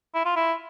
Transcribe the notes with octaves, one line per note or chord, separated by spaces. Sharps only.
E4
F4
E4